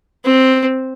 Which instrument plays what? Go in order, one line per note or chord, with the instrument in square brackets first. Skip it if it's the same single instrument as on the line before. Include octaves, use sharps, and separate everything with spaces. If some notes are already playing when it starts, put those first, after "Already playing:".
[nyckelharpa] C4